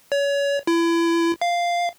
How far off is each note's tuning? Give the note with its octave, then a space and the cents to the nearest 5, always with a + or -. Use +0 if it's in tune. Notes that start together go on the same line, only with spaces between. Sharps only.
C#5 +30
E4 +30
F5 -5